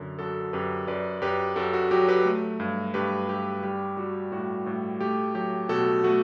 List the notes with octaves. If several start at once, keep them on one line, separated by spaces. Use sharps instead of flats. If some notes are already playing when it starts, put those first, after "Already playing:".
Already playing: F#2 D3
F#2 F#4 A4
F#2 G4 B4
F#2 B4 D5
F#2 G4 B4
F#2 F#4 A4
F#4
F#3 G4
G4 B4
A3
G2
G2 G4 B4
G2 G4
G3 G4
G3 F#4
A2 F#4
A2
A3 G4
F#3 G4
B2 F#4 A4
A3 F#4